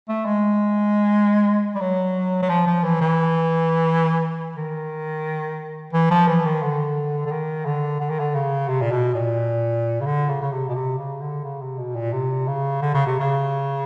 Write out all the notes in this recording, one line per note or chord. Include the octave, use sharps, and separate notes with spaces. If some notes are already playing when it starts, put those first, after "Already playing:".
A3
G#3
G3
F#3
F#3
F3
F3
E3
E3
D#3
E3
F3
E3
D#3
D3
D3
D#3
D3
D3
D#3
D3
C#3
C3
A#2
B2
A#2
C#3
D3
C#3
C#3
C3
B2
C3
C#3
D3
C#3
C3
B2
A#2
C3
C#3
D3
C#3
C3
C#3